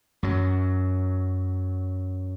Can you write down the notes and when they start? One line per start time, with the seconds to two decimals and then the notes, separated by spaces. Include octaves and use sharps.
0.23 F#2 F#3